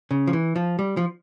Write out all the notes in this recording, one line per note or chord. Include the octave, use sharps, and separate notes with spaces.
C#3
F3
E3
F3
G3
F3